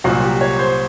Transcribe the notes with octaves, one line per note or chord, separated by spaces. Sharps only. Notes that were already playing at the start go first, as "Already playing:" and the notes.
C2 A#2 F#3 F#4
G4
C#5
C5